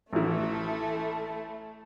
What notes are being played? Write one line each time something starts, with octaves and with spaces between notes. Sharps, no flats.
A1 E3 A3 E4